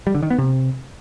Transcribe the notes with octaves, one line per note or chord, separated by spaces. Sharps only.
G3
D3
D#3
B3
C3